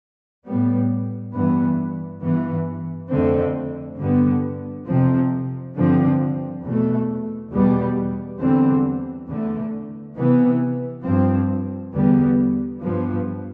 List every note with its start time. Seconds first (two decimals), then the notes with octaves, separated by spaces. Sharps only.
0.45 A2 G3 B3
1.33 G2 E3 B3
2.21 G2 E3 B3
3.10 F2 D3 A3 C4
3.98 G2 D3 G3 B3
4.86 F2 C3 F3 C4
5.75 G2 D3 F3 C4
6.63 E2 B2 A3
7.52 E2 B2 G3 B3
8.39 E2 D3 G3 C4
9.28 E2 D3 A3
10.16 C3 E3 B3
11.04 G2 F3 C4
11.93 E2 D3 G3 B3
12.82 G2 F3 B3